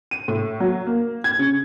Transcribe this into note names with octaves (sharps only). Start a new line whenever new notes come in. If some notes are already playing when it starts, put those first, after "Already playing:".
D#7
A2
F#3
A#3
G#6
C#3